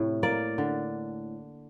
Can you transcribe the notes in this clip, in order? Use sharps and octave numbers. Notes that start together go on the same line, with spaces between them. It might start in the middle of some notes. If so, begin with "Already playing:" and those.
Already playing: A2 C3 A3
A#3 D5
D3